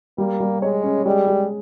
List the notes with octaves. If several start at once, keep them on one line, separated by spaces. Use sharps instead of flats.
G3 A#3
G3
G#3 C#5
C#4
G3 G#3
G#3